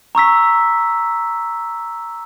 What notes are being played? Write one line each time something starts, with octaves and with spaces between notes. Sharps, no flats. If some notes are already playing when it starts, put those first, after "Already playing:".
A#5 C#6 E6 B6